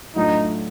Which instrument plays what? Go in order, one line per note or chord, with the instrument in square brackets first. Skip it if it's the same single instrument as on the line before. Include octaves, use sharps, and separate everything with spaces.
[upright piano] A2 F#3 A3 D4 F4 [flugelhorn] D#4